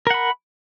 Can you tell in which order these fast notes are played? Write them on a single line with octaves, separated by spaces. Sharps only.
A#4 F#5 B5